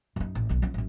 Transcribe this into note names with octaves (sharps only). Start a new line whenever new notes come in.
F#2 D#4
A1
B1 D3
F3 C#4
A1 F#2